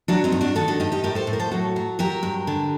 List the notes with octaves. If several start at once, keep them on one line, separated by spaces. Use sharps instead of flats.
F#3 D4 F#4
C4 D#4
G2
D4 F#4
D#3 F#4 A4
D4 F#4
G2 D#4 G4
D#4 G4
A2 G4 A#4
A4 C5
A2
A#4
A4 C5
F#3 F#4 A4
F#3
F#3 G4 A#4
G2
D3